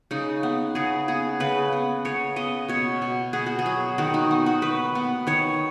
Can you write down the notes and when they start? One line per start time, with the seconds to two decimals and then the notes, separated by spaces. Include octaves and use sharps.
0.11 C#3 D#4
0.43 B3
0.75 C#3 G#4
1.08 B3 G#4
1.40 C#3 B4
1.72 B3
2.05 C#3 C#5
2.36 B3 D#5
2.69 B2 C#5
3.02 B2
3.33 B3 G#4
3.46 F#4
3.59 G#4
3.66 F#3
3.98 D#3 F#4
4.14 D#4
4.31 B3
4.46 F#4
4.62 D#3 B4
4.95 B3
5.27 D#3 C#5